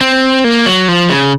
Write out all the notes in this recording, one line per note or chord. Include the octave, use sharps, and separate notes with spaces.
C4
A#3
F#3
F3
C#3